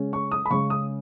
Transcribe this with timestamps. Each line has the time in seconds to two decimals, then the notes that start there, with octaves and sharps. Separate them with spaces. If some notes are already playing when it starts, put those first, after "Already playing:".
Already playing: C#3 G#3 C#4
0.13 C#6
0.31 D#6
0.46 B5
0.50 C#3 G#3 C#4 C#6
0.70 D#6